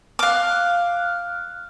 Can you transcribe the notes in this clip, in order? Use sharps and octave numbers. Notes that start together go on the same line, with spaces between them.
F5 D6 F6 F#6